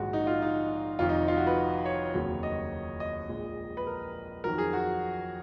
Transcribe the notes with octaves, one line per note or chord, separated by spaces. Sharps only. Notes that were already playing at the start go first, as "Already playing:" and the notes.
Already playing: A#1 G#2 D#3 G#3 F#4
D#4
F4
D#4
F1 F2 D#3 F4
D#4
F4
F#4
B4
C#5
F1 D#2 C#3 F#3
D#5
D#5
A#1 A#2 G#3
B4
A#4
F2 D#3 F#3 A#4
G#4
F#4